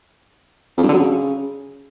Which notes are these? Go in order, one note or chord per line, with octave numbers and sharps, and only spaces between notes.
F2
G2
D3
F#3
C#3